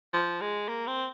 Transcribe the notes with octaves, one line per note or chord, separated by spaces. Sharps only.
F3
G#3
A#3
C4